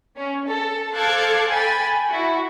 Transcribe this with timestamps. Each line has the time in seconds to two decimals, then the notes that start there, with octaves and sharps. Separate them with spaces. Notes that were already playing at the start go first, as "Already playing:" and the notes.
0.16 C#4
0.44 A4
0.93 A4 C5 F5 D6 F#6 G#6
1.49 G5 G#5 B5 A6
2.07 E4 F#4